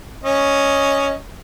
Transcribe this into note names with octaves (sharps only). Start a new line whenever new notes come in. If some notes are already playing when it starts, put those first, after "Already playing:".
C#4 D#5